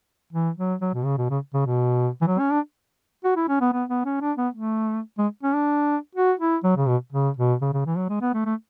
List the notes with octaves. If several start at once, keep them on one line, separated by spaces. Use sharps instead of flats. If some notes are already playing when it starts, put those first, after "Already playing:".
E3
F#3
F#3
B2
C#3
B2
C#3
C#3
B2
E3
F#3
C#4
D4
F#4
E4
C#4
B3
B3
B3
C#4
D4
B3
A3
G#3
C#4
D4
F#4
E4
F#3
C#3
B2
C#3
B2
C#3
C#3
E3
F#3
G#3
B3
A3
A3